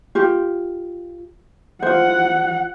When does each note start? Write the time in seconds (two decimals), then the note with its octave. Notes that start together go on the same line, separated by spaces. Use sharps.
0.15 F4 G4
1.82 F4 C5 F#5